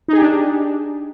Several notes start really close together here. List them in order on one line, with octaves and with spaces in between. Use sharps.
D#4 G#4 G4 D4